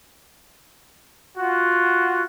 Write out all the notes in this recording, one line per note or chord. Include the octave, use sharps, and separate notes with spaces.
F4 F#4